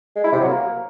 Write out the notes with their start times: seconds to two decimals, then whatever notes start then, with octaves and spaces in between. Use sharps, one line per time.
0.16 G#3
0.24 E4
0.32 C3
0.41 F#3
0.49 A#3